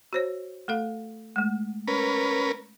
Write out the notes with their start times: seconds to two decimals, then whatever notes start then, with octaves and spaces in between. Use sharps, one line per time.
0.13 F#4 C5 C#5
0.68 A3 A4 F5
1.36 G#3 A3
1.88 C#4 A#4 B4